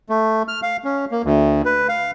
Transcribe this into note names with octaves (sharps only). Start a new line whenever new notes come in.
A3
F6
F5
C#4
A#3
D2
B4
F5